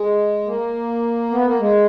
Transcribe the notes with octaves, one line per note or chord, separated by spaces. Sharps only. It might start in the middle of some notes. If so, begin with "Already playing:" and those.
Already playing: G#3
A#3
B3
A#3
G#3